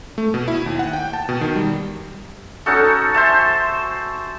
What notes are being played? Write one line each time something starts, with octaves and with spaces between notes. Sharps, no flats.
A3
B2
E4
D#2
F#5
G5
A5
B2
D#3
G3
C#4 D#4 F#4 A4
C5 E5 A5